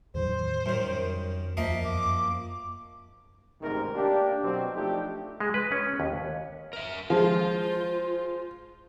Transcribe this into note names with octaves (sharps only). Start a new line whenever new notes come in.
E2 A2 D#3 F#3 C5
F#2 D#3 G3
F2
D#2 F3 A#3 D#5 E5
F#2 D6
A1 D2 G#2 C3 D#3 A#4
A#3 D4 G4
B2 F#3 C4
F3 A3 D4 D#4 G4 A4
G#3
B4
C#4
D#2
A#4 E5
F3 G#3 F4 C5